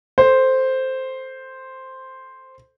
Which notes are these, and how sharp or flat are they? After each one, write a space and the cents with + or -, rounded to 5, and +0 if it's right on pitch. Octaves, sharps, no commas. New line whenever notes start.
A4 +0 C5 +0